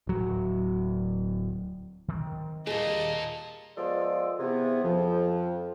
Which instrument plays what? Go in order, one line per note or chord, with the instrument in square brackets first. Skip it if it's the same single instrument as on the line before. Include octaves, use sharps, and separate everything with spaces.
[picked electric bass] D1 F#3
[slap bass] D#3 C4
[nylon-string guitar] D#2 G3 G#4 [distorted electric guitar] A#2 [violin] D#5 A5
[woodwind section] F3 G#3 B3 F4 A4 D5
C3 E3 B3 G#4
F2 F3